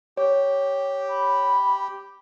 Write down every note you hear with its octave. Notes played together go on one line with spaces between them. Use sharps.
G4 C#5
B5